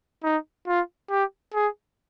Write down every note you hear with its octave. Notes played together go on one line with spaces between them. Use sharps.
D#4
F4
G4
G#4